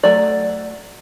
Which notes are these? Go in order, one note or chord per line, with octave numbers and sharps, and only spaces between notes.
F#3 A3 D5